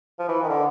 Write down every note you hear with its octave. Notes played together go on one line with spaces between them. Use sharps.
F3
E3
D#3
D3